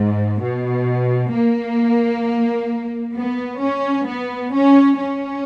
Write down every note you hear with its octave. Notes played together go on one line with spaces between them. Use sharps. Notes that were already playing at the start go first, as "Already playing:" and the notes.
Already playing: G#2
B2
A#3
B3
C#4
B3
C#4
C#4